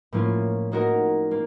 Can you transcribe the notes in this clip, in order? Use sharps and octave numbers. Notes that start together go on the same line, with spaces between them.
A2 F3 A#3 C#4 F4
A#3 D#4 F#4 A#4
A#3